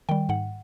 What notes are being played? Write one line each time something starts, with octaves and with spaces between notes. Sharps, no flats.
D#3 G3 G5
G#2 F#5